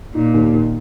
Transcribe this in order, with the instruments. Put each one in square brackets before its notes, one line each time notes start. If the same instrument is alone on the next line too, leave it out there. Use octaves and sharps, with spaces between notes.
[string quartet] A#2 [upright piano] D#4
[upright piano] D#2
D#3